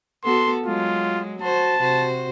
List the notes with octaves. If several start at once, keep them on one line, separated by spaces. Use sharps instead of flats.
B3 F#4 A4 C6
F#3 G#3 F4
F#4 C5 A5
C3 F#4 C5